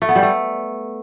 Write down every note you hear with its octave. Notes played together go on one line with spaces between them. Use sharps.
A3
B3
G3
A3